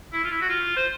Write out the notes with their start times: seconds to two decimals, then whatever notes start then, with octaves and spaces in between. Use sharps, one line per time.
0.13 E4
0.24 F4
0.31 E4
0.41 F#4
0.49 F4
0.76 C5